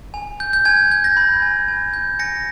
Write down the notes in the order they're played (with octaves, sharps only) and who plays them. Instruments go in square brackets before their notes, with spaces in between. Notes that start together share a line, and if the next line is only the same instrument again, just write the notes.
[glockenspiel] G#5
G6
G6
G#5 G#6
G6
G6 A#6
B5
G#5
G#5
G6
G#5 A#6 C#7